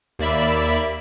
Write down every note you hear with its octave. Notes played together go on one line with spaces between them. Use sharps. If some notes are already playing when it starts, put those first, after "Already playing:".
D#2 A#3 D5 E5 B5